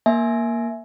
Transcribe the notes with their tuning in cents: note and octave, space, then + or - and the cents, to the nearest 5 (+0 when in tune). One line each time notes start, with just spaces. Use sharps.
A#3 +5 E5 +0 G#5 +15